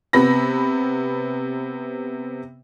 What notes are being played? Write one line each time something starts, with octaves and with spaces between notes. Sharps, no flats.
C3 B3 B5 A#6